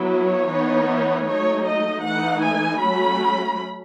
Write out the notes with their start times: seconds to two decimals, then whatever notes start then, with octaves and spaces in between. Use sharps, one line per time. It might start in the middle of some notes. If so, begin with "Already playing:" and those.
Already playing: F#3 B3 E4
0.11 C#5
0.49 E3 B3 D#4
1.26 F#3 A3 D#4 C#5
1.65 D#5
2.03 E3 A3 D#4 F#5
2.41 G#5
2.79 F#3 A3 C#4 B5